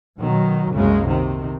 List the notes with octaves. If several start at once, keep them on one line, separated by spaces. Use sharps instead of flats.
B2 D#3 F#3
C2 F#2 C#3 G#3 A#3
C3 D#3